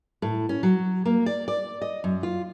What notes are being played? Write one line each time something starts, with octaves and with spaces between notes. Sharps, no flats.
A2
C#4
F#3
A#3
D5
D5
D#5
F#2
F4